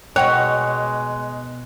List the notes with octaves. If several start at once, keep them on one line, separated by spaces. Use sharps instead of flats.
B2 G#3 C#5 F#5 G5 A#5 F#6